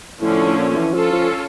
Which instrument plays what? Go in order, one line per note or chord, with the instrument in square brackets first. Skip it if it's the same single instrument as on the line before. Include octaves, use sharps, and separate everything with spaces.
[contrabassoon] A2 [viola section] D3 F3 A3 C#4
[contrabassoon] A2
A#2
E3
[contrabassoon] F3 [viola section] C#4 F4 A4
[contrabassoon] F3